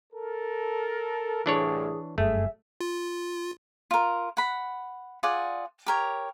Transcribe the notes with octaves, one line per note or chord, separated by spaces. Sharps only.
A4 A#4
C2 A2 E3 D4 G#4 C#5
F#1 G2 A3 G#4 E5
F4
F4 A#4
F#5 B5
F4 G#4 D5 F#5
G4 A#4 C#5